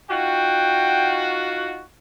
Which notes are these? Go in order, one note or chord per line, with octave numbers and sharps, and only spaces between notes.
D#4 F4 F#4 G5